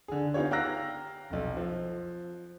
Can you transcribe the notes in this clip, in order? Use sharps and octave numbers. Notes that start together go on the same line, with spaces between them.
D3 G#4
B3 D#4 F4 G4 C#5
F5 G5 A#5 E6 F#6 A#6
F1 B1
F3